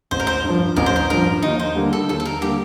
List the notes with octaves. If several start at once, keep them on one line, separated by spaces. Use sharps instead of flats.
A1 C5
A#4
C5
G2
F3
A1 A#4
C5
A#4
G2 F3 A#4
D#2 D#4
C5
D3 G3 A#3
A4
D#2 A4
A4
A#4
D3 G3 A#3 G4